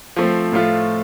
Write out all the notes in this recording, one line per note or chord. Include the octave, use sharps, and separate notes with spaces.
F3 A3 C4
A2 F3 A3 F4